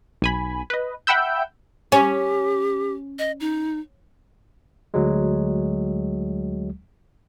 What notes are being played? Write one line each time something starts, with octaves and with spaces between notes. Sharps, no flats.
B1 G#5 B5
B4 D#5
E5 F#5 G5 B5 E6 G6
C#4 G4
D#5
D#4
D2 F#3 G#3